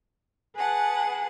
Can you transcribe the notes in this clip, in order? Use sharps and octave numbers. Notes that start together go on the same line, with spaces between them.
G#4 B4 F#5 A5